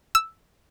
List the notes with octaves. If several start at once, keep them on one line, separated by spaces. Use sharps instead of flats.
E6